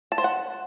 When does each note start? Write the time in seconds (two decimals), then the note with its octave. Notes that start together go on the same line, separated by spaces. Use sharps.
0.12 A5
0.18 C5
0.24 F#5